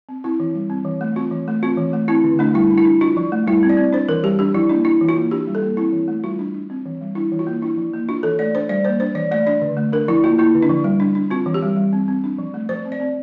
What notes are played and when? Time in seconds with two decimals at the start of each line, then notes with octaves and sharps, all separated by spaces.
0.09 C4
0.24 C4 E4
0.40 E3
0.55 G3
0.70 C4
0.85 E3
1.01 A3
1.16 C4 F4
1.31 E3
1.48 A3
1.63 C4 F4
1.78 E3
1.93 A3
2.08 C4 E4
2.24 D3
2.39 A3 D4
2.54 G3 E4
2.71 D4
2.78 E4
2.85 D4
3.01 D4 F4
3.17 F3
3.32 A3
3.47 G3 E4
3.63 C4
3.69 D5
3.77 C4
3.92 D4 C5
4.09 E3 A#4
4.23 G3 G4
4.39 D4 G4
4.54 F3 E4
4.69 A#3 D4
4.85 D4 E4
5.01 E3
5.09 F4
5.17 A#3
5.31 D4 G4
5.47 G3
5.55 A4
5.62 A#3
5.77 C4 E4
5.92 E3
6.08 A3
6.24 G3 F4
6.39 D4
6.54 D4
6.70 C4
6.86 E3
7.01 G3
7.15 D4 E4
7.32 E3
7.39 F4
7.47 A#3
7.62 D4 E4
7.77 F3
7.93 A#3
8.09 D4 F4
8.23 E3 A4
8.39 A3 D5
8.54 D4 C5
8.69 G3 D5
8.84 A#3 C5
9.00 D4 C5
9.15 E3 D5
9.31 A3 D5
9.47 D4 D5
9.62 D3
9.77 A3
9.93 D4 A#4
10.08 F3 E4
10.24 A#3 F4
10.39 A#3 E4
10.55 D3
10.62 D4
10.69 F3
10.84 G3
11.00 D4
11.15 D4
11.30 C4 F4
11.46 E3
11.54 G4
11.62 G3
11.77 G3
11.93 C4
12.08 C4
12.24 D4
12.38 F3
12.54 A3
12.69 F3 C5
12.85 C4
12.92 D5
13.00 C4